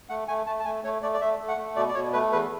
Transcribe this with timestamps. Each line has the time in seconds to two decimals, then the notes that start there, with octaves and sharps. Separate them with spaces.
0.09 A3 F#5
0.28 A3 G#5
0.47 A3 A5
0.60 A5
0.65 A3 G#5
0.84 A3 C#5
1.02 A3 D5
1.14 D5
1.21 A3 E5
1.39 A3
1.48 F#5
1.57 A3
1.76 B2 D5
1.89 D5
1.95 B2 C#5
2.13 A3 B4
2.32 E2 B4